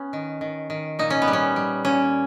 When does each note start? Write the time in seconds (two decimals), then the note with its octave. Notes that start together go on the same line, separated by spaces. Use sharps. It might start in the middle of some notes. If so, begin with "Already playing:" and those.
Already playing: B3 C#4
0.13 D#3
0.41 D#3
0.70 D#3
0.99 A#2 D#4
1.10 C#4
1.22 B3
1.28 G3
1.33 C#4
1.56 G3
1.85 A#2 C#4